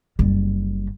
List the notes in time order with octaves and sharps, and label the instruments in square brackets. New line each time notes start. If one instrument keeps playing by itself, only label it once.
[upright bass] F#1 G3